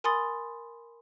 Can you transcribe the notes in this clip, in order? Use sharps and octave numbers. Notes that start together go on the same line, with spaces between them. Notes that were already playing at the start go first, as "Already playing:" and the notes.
A#4 G#5 B5 C6 D#6 A6